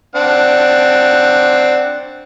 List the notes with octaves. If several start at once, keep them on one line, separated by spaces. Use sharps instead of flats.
C4 D4 F#5